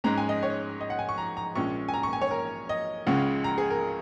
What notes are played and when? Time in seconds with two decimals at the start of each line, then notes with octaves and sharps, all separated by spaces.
0.04 G#2 G#3 C#4 A#5
0.18 G#5
0.29 D#5
0.43 C#5
0.81 D#5
0.90 F#5
0.99 G#5
1.09 C#6
1.18 A#5
1.37 A#5
1.55 A#1 A#2 G#3 C#4 C#6
1.88 G#5
1.94 A#5
2.03 C#6
2.13 G#5
2.22 C#5
2.31 A#4
2.69 D#5
3.07 C#2 C#3 G#3 C#4 F#5
3.44 A#5
3.58 G#4
3.70 A#4